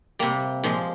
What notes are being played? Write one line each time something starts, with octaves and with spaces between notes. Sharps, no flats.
C3 G3 A#3
A#2 F3 G#3